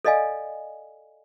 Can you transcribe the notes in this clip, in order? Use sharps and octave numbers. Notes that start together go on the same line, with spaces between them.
A4 D5 D#5 F5 G#5